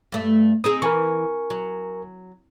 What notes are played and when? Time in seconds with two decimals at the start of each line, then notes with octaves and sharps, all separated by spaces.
0.12 G2 A3
0.64 C4 D#4 G#4 D#6
0.82 E3 A#4 G#5 C#6
1.50 F#3